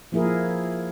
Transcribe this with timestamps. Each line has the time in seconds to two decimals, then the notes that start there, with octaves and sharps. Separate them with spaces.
0.12 F3 A#3 E4 G#4 A#4